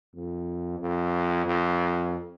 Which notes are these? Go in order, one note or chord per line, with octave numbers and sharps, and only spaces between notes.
F2
F2
F2